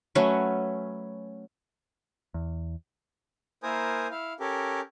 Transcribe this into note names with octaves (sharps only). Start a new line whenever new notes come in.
F#3 A3 C#4 B4
E2
A#3 E4 A#4 C5 G#5 D#6
E4 F5
C#4 G4 A4 A#4